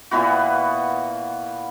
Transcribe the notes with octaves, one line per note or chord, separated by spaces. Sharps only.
A#2 E3 B3 F#4